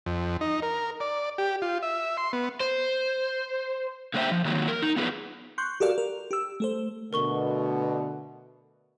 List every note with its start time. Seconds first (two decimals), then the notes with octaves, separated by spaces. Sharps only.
0.06 F2
0.41 D#4
0.62 A#4
1.00 D5
1.38 G4
1.62 F4
1.83 E5
2.17 C6
2.33 B3
2.60 C5
4.14 D3 A3 A#3 C5 E5 G5
4.31 F3
4.45 D#3 F#3 A#3
4.68 A#4
4.82 D#4
4.96 B3 F4 G#4 B4
5.58 C6 C#6 F#6 G6
5.80 F#4 G4 A4 A#4 D5 F5
5.98 A#4
6.31 G4 E6
6.60 A3 A4 C5
7.13 B2 D3 A3 A#4 C#6 G7